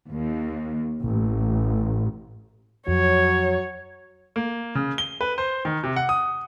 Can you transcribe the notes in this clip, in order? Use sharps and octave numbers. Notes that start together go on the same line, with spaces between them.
D#2
A1
F2 F#3 C#5
A#3
C#3
G7
B4
C5
D#3
C3
F#5
D#6